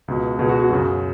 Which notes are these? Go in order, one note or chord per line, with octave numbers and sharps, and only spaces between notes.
C#2 B2
C#2 B2 G#4
F#4
F#4
F#2 C#3 F#4